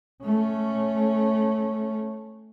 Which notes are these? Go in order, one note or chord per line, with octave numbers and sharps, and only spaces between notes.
A3 C#4